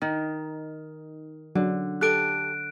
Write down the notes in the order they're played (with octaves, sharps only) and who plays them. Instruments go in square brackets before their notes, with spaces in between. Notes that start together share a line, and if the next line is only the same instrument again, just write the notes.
[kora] D#3 [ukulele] D#4
[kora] D3 [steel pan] F#3
[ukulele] G4 A4 [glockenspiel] F#6 D7